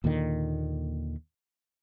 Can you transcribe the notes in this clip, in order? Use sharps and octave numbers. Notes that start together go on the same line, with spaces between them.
D#2 A#2 D3 D#3